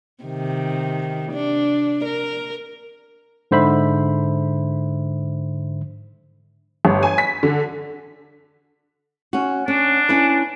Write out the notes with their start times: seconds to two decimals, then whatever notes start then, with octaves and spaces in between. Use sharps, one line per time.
0.24 C3 D#3
1.32 D4
2.05 A#4
3.51 G#2 D3 C5 E5 B5
6.85 G1
7.03 G#5
7.18 B6
7.43 D3
9.33 C#4 F#4
9.68 C#4 D4
10.09 C#4 E4 B4